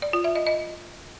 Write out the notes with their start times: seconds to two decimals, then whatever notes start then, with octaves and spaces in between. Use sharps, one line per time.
0.02 D5
0.13 F4
0.24 E5
0.35 D#5
0.47 D#5